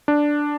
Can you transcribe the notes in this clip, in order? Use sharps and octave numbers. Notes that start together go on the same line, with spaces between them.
D4